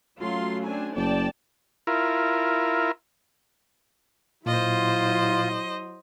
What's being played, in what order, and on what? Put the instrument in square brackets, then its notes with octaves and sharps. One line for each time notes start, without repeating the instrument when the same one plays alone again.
[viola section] F#3 F4 C6 [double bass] A3 C#4
[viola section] C4 D4 G#5
[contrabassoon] F#1 [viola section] D5 G5 A5
[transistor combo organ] E4 F4 A#4
[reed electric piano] A#2 [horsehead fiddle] F#3 E4 [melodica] F4 [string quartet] C5 D#5